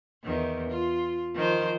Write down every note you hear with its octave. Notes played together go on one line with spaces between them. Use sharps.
E2 D#3
F4
D#3 F3 C5